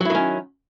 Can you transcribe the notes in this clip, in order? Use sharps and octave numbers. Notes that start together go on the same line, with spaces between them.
D#3 F#3 C#4 E4